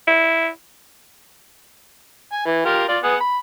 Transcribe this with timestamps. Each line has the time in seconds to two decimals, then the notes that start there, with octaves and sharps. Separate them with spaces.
0.08 E4
2.32 G#5
2.46 E3
2.65 F4 G4 A#4
2.88 F4 D5
3.03 B3 G#4 F#5
3.20 B5